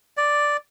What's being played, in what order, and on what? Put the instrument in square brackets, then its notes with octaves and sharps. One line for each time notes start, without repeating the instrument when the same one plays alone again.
[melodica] D5